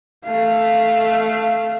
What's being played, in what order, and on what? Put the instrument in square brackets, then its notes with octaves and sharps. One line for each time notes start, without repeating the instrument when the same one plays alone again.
[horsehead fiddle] A3 F5